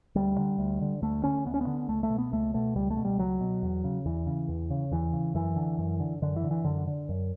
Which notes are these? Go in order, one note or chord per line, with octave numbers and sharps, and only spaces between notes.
D2 G3
D3
D2
D3
D2 A3
D3 C#4
D2 B3
C#4
B3
D3
C#2 A3
A3
B2
B3
C#2 A3
B2 A3
C#2 G3
A3
B2
G3
C#2 F#3
B2
E2
C#3
E2 E3
C#3
E2
C#3
E2 E3
C#3
F#2 E3
D3
F#2
D3
F#2 D3
E3
D3
E3
F#2 D3
D3
F#2